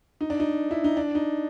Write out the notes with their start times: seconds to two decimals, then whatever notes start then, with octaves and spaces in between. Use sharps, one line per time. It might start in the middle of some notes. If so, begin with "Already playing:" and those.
0.21 D#4
0.30 D4
0.40 D#4
0.71 E4
0.84 D#4
0.97 D4
1.15 D#4